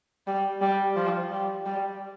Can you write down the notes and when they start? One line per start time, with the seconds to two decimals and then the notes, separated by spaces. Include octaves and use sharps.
0.27 G3
0.61 G3
0.96 F3
1.31 G3
1.66 G3